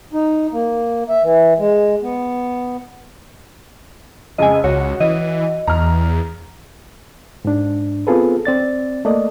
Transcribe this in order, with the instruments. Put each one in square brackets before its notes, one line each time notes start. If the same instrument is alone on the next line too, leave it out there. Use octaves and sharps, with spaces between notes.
[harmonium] D#4
A#3
E5
E3
G#3
B3
[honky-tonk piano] F2 C#3 G#3 [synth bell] D#5 G#5
[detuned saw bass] C#2 [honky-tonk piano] F#4 [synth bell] C#5
[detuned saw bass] E3 [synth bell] D#5
[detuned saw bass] E2 [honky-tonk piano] A#5 F6
[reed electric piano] G#2 D4
B3 C4 F4 G#4 A4 B4
C4 D5 A6
A3 A#3 D5 D#5